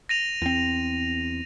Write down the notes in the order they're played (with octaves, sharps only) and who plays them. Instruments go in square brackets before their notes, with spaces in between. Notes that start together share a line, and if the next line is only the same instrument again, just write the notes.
[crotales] A#6 D#7 F7
[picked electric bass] E2 C4